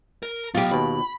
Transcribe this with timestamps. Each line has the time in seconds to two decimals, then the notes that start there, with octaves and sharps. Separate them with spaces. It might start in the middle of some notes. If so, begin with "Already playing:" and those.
0.23 A#4
0.55 F#3 B3 F4 G4
0.71 D#2 B2 B5